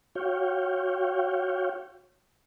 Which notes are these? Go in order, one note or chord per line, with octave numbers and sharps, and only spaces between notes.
F#4 C#5 F5 G5